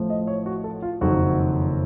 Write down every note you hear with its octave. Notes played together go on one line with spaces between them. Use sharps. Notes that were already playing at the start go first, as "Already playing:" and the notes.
Already playing: A1 A2 F3
D#5
C#5
F#4
A4
F4
F#1 F2 D#3 F#3 F#4